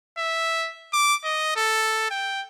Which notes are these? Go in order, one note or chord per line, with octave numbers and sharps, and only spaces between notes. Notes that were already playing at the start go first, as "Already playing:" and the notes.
E5
D6
D#5
A4
G5